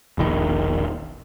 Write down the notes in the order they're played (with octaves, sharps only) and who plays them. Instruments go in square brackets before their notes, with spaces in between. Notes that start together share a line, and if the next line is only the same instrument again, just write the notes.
[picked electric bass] E1 A#1 D#3